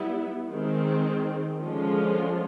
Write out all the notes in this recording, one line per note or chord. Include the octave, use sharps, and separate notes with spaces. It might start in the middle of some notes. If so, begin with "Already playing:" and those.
Already playing: G3 B3 E4
D#3 G#3 C4
D3 F3 G#3 C#4 F4